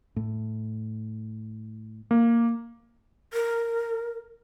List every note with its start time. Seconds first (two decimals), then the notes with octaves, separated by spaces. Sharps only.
0.16 A2
2.11 A#3
3.33 A#4